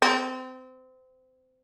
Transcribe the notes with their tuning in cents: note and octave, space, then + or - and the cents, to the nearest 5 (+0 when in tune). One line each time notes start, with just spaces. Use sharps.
C4 -25